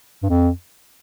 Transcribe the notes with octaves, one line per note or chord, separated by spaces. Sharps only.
G2
F2